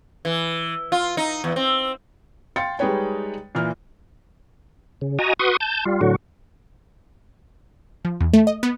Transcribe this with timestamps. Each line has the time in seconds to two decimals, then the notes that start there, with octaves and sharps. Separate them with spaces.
0.25 E3
0.92 F4
1.17 D#4
1.44 E2
1.56 C4
2.56 F5 G5 C6 A6 C#7
2.79 G3 G#3 D#4 B4 C#5 G5
3.55 A#2 E3 A#3 F6
5.01 C#3
5.19 F#4 D#5 G#5 A#5
5.39 F#4 B4 C6 C#6 D#6
5.60 A5 G6
5.85 G3 F4
6.01 A2 D3 F#3 F#4
8.05 F3
8.20 E2
8.33 A3
8.47 D#5
8.63 B3